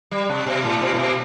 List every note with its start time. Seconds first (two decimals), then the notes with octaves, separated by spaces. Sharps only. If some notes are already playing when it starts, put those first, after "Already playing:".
0.11 G3
0.29 C3
0.47 B2
0.64 A2
0.82 B2
0.94 A2
0.99 B2